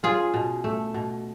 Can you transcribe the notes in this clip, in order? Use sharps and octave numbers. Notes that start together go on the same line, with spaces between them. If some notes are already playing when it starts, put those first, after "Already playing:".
C#4 F4 G#4
B2
A3
B2